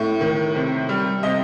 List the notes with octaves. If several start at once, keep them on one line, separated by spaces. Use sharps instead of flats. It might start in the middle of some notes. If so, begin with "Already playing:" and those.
Already playing: A2
D#3
C3
G3
C3 D#5